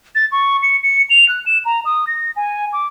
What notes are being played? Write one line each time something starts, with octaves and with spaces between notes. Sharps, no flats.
A6
C#6
C#7
C#7
F7
F#6
E7
A#5
D#6
A#6
G#5
D6